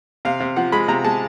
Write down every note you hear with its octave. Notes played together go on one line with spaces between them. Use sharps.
C3 F5
C3
F3 F#5
G#3 B5
C3 A#5
G#3 A5